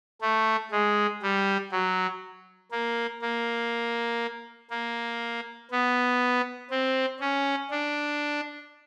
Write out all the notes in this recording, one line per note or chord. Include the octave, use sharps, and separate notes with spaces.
A3
G#3
G3
F#3
A#3
A#3
A#3
B3
C4
C#4
D4